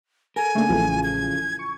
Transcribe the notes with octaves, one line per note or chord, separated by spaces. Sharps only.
A4 A#4 G#5
C#3 A3 A#3 D4 G#4
A1 E3 F3 A3
G#6
C#6